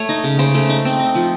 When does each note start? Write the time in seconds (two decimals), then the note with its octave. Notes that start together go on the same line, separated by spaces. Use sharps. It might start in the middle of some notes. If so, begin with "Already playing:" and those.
Already playing: A3 C#5
0.09 D#4
0.24 C#3
0.39 C#3 C5
0.55 A3
0.69 D#4
0.85 C4
0.99 D#4
1.15 F3